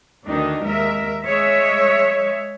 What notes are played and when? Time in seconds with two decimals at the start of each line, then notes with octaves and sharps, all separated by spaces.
0.24 D2 D#3 D4 D#4
0.63 D#2 G#3 A#4 E5
1.24 G#3 C#5 E5